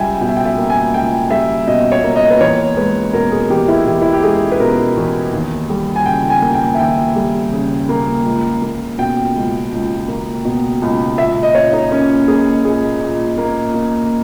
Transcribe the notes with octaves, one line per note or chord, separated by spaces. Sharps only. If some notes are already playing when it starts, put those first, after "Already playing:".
Already playing: C#2 G3 E5 G5 G#5
B2 G5
E5
G5
E5
A#3
G#5
C#2 G5
G3 E5
B2 D#5
C#5
A#3
D#5
B4
E2 C#5
G#3 B4
B2 A#4
G#4
E2 G4
E4
E2 G4
E4
G4
G#3 G#4
B4
B2 A#4
E2
D#2
G3
G#5
C#3 G5
G#5
A#3
G5
E5
D#2 G5
G3
C#3
A#3
C#2
A#3
B2 G5
C#2
C#2
A#3
B2
C#2
A#2 E5
D#5
A#2 C#5
D#4
A#3 C#4
A#3 G#4
A#2 G#4
A#2
A#3
A#3